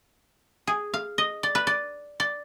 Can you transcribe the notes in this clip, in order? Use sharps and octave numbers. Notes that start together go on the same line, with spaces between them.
G#4
F5
D#5
D5
B4
D5
D5